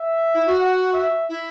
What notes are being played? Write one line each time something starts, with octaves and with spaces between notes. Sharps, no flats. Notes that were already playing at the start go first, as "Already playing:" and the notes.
Already playing: E5
E4
F#4
F#5
E5
E4